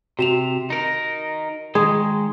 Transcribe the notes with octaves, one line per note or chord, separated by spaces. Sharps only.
C3 F#4 E7 F7
D#4 A#4
D#3 G#3 G#4